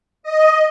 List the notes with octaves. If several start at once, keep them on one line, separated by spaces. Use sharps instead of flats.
D#5